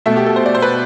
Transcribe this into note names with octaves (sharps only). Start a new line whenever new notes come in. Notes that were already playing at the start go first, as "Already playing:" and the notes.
B2 A3 E5
G4
A4
C5
D5
C5
B4